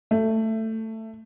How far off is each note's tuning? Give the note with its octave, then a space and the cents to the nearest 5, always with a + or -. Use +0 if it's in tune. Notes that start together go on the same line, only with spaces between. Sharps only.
A3 +15